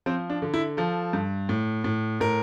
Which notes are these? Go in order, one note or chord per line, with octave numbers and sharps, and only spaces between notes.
F3 C4
D4
D3
E4
F3 A4
G2
A2
A2
A2 A#4